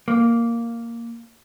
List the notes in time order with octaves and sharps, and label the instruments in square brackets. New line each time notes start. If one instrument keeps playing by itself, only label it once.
[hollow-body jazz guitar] A#3